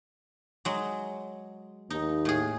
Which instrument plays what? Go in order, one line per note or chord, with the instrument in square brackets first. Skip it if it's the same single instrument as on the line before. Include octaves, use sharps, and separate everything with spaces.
[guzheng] F#3 G#3
[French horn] D#2 [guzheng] D#4
[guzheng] A2 G#4